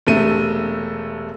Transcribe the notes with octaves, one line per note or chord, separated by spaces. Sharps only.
E1 C3 A3 D#7